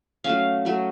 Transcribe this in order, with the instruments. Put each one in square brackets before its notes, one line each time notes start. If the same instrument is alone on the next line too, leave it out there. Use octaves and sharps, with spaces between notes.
[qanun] F#3 A3 C#4 F5
F#3 A3 C#4